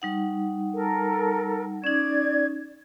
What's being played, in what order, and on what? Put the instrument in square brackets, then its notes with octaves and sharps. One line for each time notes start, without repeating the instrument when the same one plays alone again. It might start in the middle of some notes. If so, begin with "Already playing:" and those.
[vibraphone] G3 D#4 F#5
[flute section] A4 A#4
[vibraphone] C#4 D#4 [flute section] D5 G#6